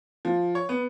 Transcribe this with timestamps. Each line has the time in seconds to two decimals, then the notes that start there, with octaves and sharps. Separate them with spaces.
0.25 F3
0.55 C#5
0.69 B3